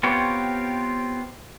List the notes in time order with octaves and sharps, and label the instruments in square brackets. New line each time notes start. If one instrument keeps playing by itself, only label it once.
[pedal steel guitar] B3 C4 F4 G4 C#5